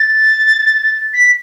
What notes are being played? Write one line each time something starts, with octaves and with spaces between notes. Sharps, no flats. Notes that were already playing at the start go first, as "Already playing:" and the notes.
Already playing: A6
B6